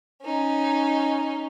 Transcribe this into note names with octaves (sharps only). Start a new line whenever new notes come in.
C#4 D#4